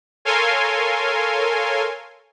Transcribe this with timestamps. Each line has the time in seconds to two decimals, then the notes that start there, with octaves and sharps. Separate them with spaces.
0.25 A4 A#4 C#5 F5 G#5 C6